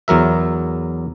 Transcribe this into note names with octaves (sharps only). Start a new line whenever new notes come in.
E2 F#3 A#4 E5